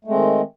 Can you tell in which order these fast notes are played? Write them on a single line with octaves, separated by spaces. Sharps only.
A3 G#3 C4 D#3